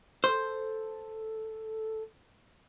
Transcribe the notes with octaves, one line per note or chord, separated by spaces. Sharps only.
A4 C5